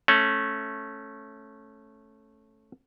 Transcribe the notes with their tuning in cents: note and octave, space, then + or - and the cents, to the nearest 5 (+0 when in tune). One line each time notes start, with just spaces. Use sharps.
A3 -5 C#4 -15